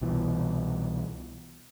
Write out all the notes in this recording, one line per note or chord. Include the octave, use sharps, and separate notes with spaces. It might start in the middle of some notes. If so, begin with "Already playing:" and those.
C2 B2 E3